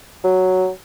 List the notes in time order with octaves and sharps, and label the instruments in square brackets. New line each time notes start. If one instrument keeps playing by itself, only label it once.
[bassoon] F#3